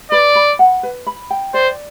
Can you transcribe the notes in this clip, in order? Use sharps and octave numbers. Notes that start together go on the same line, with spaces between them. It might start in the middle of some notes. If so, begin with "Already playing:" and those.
B4 D5
B5
F#5
B4
B5
G5
C5 D5